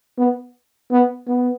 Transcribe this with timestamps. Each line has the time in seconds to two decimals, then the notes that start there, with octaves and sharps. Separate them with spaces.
0.18 B3
0.91 B3
1.27 B3